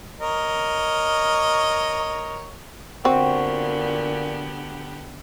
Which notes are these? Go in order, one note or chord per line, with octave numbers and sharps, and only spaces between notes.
A#4 C#5 D#5
A#2 D3 B3 C4 F#4 G4